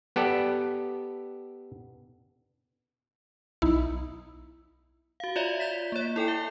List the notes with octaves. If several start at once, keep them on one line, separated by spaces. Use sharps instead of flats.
B3 G4 A4 D5
B1 D#4 E4
F#4 F5
F4 C#5 D5 E5 A#5
G6 A6 B6
A#3 C#5
E4 A4 G5 G#5
E5